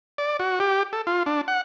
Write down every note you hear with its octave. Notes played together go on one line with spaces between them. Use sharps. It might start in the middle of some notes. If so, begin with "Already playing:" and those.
D5
F#4
G4
A4
F4
D4
F#5